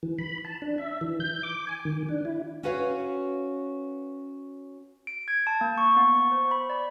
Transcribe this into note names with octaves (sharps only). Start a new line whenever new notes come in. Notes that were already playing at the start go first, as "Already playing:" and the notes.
E3
B5
A5
D4
E5
E3
G6
D6
G#5
D#3
D4
E4
C#4 F#4 B4 C#5 F5
D7
G#6
A5
A#3
C#6
B3
C#6
C5
B5
D5